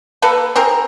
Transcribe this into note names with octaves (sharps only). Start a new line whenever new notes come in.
A#3 A4 B4
C4 G#4 A#4